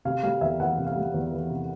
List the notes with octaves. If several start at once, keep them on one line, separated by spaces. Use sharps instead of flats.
C3 F5
G3 F5
E2 E5
E3 F#5
C3
F5
G3
E2
E3
C3